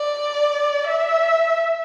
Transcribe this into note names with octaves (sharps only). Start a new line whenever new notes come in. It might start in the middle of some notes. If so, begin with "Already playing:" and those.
Already playing: D5
E5